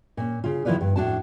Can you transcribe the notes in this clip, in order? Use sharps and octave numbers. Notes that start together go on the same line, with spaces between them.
A#2 C#4
C#3 F4
D#3 F3 E4 F4 B4 D5
G2
F2 A2 E3 D4 F#4 A5